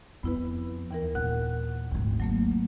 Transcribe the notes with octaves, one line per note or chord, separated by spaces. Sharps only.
F2 B3 E4 B4
D#2 E3 A#4
A#2 F#5 F#6
G#1 D2
F#3 A3 A#3